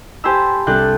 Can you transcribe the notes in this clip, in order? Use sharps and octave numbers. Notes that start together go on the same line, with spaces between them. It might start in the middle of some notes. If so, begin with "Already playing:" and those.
G4 C5 G#5 A5 B5 E6
C2 D4 A4 A5 F#6 G6